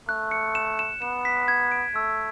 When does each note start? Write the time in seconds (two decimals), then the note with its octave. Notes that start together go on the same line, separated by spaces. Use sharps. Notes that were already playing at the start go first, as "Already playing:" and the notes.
0.08 A3 F#6
0.31 C#7
0.55 E7
0.79 E7
1.02 B3 E7
1.25 B6
1.48 G#6
1.72 D7
1.95 A3 E6